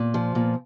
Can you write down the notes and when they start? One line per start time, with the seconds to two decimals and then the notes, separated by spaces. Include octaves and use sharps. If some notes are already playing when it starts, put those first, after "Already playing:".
Already playing: A#2
0.14 F3
0.35 A#2